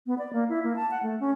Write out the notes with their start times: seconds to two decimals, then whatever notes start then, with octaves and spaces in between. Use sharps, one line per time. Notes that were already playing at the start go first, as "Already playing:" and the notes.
0.07 B3
0.18 D5
0.33 A#3
0.49 E4
0.64 A#3
0.76 A5
0.91 F#5
1.03 A3
1.20 C#4